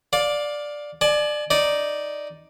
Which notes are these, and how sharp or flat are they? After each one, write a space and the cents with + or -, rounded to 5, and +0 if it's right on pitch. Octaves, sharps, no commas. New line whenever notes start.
D5 +0 F5 +20
D5 +20 G#5 +45
D#4 +0 D5 +0